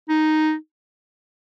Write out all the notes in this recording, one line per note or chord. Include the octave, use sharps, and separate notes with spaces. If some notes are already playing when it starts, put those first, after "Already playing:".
D#4